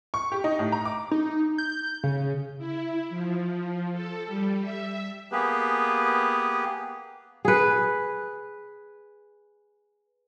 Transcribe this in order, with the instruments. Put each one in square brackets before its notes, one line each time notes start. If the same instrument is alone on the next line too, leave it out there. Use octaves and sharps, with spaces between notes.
[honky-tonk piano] C#6
G4
D#4
A2
A#5
D6
[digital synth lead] D#4
G6
C#3
[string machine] E4
F3
A4
G3
E5
[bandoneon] A#3 B3 G4 G#4 B4
[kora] G#4 B4